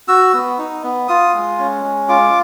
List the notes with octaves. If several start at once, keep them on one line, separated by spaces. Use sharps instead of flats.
F#4 E6
B3
D#4
B3
F4 D#6
G#3
C#4
G#3
F4 D6